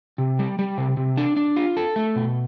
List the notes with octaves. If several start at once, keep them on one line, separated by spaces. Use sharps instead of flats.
C3
G3
G3
C3
C3
D4
D4
F4
A4
A3
B2